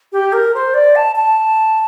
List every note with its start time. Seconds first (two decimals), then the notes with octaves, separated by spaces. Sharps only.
0.12 G4
0.33 A#4
0.54 C5
0.74 D5
0.96 A5
1.15 A5